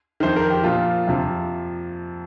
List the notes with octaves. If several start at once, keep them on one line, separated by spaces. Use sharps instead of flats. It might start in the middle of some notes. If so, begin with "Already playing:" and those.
F2 D#3 C5
A#4
G4
A#2 F3 F4
F2 C3 F3